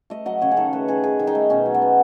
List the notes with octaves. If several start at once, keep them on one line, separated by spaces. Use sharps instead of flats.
A3 D#5
F#3 D#5
C#3 C#5
G#4
D#3 A4
A3 B4
D#3 G#4
D#3 G#4
D#3
D#4
A3
B2 C#4
F#3
B3
B2